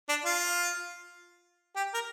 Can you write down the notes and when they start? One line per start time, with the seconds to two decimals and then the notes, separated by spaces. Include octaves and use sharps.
0.09 D4
0.26 F4
1.76 G4
1.94 A#4